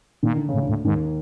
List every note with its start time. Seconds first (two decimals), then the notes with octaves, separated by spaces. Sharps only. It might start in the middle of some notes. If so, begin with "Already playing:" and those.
0.23 A#2 D#3
0.36 D3
0.49 C#3
0.54 A2
0.61 D2 D3
0.69 A2
0.85 D#2 G#2 D#3